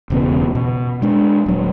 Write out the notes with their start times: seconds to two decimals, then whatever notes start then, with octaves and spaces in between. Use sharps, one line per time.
0.10 E1 C#3 B3
0.55 B2
1.02 G#3 D4
1.46 D#1 F#3